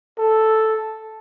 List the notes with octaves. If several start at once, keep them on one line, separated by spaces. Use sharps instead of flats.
A4